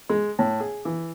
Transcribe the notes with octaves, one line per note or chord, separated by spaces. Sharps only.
G#3
A2
G#4
E3